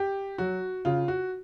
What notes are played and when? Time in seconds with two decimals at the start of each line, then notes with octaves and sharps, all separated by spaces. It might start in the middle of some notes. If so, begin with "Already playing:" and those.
Already playing: G4
0.38 F#3 F#4
0.85 C#3 F4
1.08 F#4